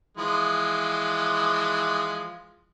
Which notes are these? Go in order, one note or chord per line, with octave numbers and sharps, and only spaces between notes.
E3 F3 G#3